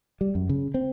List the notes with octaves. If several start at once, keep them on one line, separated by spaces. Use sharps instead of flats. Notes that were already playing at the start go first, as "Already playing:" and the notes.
G3
F#2
C#3
C4